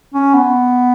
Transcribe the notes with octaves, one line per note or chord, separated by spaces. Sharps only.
C#4
B3